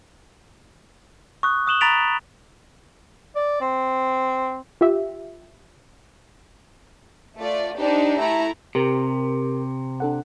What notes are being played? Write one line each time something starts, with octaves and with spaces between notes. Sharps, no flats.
C#6 D#6 F#6
C#6 D#6 F#6 E7 F#7 G7
A#5 B5 A6 B6 D7 F7
D5
C4
F4 G4 E5
A3 F4 D5
D4 D#4 G4 C5
A3 E4 A#5
C3 G4 A#4
D4 A4 F#5